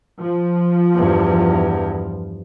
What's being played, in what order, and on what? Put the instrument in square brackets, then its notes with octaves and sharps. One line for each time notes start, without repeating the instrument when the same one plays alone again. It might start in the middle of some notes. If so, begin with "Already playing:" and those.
[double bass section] F3
[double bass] E2 G2